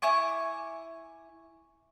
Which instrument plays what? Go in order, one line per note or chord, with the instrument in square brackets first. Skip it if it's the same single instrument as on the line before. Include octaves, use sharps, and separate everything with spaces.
[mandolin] E4 G#5 C#6 D6